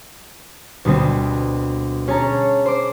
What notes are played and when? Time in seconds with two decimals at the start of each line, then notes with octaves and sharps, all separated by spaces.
0.85 D2 B2 G3 B3 C4
2.07 C#4 G#4 C#5 A5 A#5
2.66 C5 D6